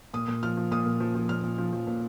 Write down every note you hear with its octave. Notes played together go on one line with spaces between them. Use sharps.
A#2 D#6
A#2
F3 F6
F3
A#2 D#6
A#2
F3
F3
A#2 F6
A#2
F3
F3
A#2